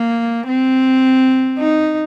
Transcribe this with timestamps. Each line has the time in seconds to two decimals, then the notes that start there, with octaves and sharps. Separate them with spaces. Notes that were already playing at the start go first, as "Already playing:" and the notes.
Already playing: A#3
0.48 C4
1.59 D#4